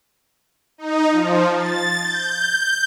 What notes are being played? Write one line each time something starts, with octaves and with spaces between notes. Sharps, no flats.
D#4
F3
A6
G6